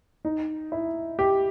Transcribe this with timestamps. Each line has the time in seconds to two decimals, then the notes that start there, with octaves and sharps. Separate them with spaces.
0.25 D#4
0.72 E4
1.19 G4